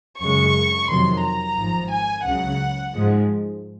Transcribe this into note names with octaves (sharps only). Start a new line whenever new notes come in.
F#2 C#3 G#3 C#6
F2 C3 D#3 F#3 C6
A#5
G#1 G#2 F3
G#5
C#2 C#3 F#3 F#5
G#2 F3 G#3